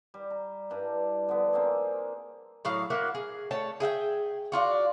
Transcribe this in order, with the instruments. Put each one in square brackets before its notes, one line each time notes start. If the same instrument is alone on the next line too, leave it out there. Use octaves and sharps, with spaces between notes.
[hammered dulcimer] G3
A#5
G2 D4 E4
D3 F3 B3
A#3 C4 D4 G#4
[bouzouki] A2 F#3 F5
A#3 E4 F#4 F#5
G#4
A3 C#5 A5
G#4 E5 F#5 G5
D4 F4 F#4